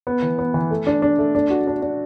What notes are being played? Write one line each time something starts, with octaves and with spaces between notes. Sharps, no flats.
B3
E3
B3
E3
A3
D4
D4
A3
D4
F#4
D4
D4